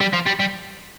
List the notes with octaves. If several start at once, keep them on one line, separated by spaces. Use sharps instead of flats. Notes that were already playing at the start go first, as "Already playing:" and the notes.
G3
F3
G3
G3